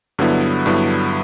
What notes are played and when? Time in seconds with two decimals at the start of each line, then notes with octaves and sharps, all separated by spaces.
0.19 G2 D3 F#3 B3 E4
0.66 G2 D3 F#3 B3 E4